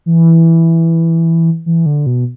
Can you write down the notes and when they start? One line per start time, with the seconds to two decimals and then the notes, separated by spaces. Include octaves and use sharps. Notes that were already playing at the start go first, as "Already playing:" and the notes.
0.06 E3
1.66 E3
1.86 D3
2.06 B2